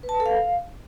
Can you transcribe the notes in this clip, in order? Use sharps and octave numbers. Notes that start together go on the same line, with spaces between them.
B4
A5
B4
A4
F5